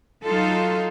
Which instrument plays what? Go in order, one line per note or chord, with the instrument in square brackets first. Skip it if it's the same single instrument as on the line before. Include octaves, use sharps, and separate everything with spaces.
[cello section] F#3 D#4 F4 A4